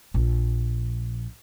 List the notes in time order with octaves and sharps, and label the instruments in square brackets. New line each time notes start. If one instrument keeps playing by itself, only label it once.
[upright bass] A#1